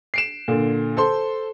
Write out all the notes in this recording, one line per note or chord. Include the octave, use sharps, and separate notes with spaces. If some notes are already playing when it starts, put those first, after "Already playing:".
C7 D7 E7
A#2 D3
A4 C5 C6